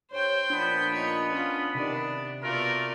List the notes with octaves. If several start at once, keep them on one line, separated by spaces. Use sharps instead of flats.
G2 C5 C#5 G5
A#2 F3 B3 D4 B5
D#4 C#5
C#4 F4
C3 D#3 D4 D5
B2 A3 F4 A#4 D5